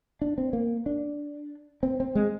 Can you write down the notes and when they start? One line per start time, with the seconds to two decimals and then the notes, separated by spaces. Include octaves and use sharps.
0.21 D4
0.38 C4
0.53 A#3
0.86 D4
1.83 C4
2.00 C4
2.15 G#3